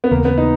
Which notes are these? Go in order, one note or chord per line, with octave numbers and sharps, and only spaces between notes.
B3
D#2 C#3 E3 A#3
B3
D#4